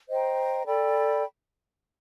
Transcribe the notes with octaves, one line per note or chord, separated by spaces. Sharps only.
C5 D#5 G5 A#5
A4 D5 G5 B5